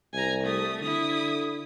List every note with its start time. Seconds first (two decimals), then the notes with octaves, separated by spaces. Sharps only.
0.13 C2 G#5 A#5
0.43 A3 D#6
0.82 D3 E4 D#6